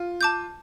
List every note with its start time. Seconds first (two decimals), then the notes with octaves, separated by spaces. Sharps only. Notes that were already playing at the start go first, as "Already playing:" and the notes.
Already playing: F4
0.21 A5 D6 G6